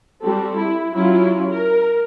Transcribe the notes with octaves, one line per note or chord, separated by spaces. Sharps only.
G3 C4 F#4 G4 A4
E4
F#3 C#4 E4 F4
A#4